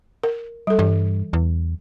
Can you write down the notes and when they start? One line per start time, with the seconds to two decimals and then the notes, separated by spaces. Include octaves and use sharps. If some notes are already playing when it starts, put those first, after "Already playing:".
0.23 A#4
0.67 G3 A4
0.79 G2 E3
1.33 E2